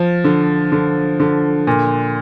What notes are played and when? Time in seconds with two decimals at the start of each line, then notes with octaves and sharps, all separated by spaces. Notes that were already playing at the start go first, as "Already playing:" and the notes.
Already playing: F3
0.24 D3
0.72 D3
1.20 D3
1.67 A#2